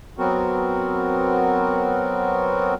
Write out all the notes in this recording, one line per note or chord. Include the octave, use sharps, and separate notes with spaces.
F#3 B3 C4 F#4 A#4